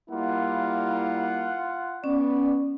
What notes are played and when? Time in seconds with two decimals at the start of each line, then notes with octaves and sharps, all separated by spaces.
0.10 G3 A#3 E4 F4 F#5
2.04 B3 C#4 D5